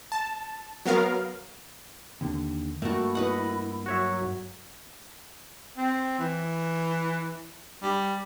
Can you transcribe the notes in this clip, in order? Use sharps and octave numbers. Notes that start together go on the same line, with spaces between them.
A5
F#3 B3 A#4 F5
D#2 D3
G2 A3 A#3 E4 F#4
B4 D#5 F#5
F#3 F#4 C#5 E5
C4
E3
G3